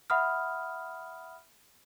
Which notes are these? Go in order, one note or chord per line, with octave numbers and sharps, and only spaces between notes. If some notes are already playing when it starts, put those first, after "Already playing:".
E5 F#5 B5 D#6 F6